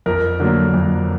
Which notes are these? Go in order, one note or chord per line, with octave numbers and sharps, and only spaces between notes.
F2 A#4
D3 F#3 A#3
F2